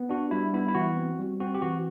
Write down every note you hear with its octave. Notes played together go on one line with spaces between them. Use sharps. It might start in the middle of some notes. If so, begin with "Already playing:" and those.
Already playing: B3
D4 F#4
G3 E4
B3 E4
E4
E3 F#4
C4
G3
C4 F#4
G4
E3 F#4